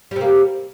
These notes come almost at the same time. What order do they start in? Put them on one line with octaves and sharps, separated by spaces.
G3 C3 A#3